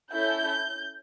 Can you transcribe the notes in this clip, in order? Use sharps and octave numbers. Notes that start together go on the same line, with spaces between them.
C#4 E4 A4 G6